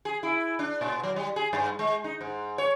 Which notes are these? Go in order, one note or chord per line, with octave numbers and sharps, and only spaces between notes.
G#4
E4
D4
A#2
F#3
G3
G#4
G2
G#3
D#4
G#2
C#5